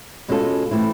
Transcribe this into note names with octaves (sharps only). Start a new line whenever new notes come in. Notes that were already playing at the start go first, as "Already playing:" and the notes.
B2 G#3 C#4 F4 A4
E3 A3 C4 E4